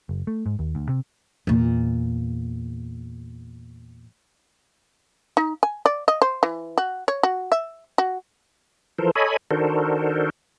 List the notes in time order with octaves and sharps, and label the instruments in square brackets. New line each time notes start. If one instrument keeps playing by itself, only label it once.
[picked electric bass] F#1
A3
G#2
D#2
D2
C3
[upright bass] E2 A#2
[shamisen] D#4
G#5
D5
D#5
C5
E3
F#4
C#5
F#4
E5
F#4
[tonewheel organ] E3 F3 A4 A#4 C5
A4 C#5 D#5 G#5 B5
D#3 D4 F#4 A4 A#4 C5